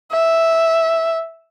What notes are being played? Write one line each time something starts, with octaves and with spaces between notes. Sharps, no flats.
E5